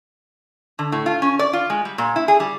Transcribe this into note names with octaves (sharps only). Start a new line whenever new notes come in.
D3
A2
F4
C#4
D5
F4
G#3
G3
A#2
E4
G#4
G3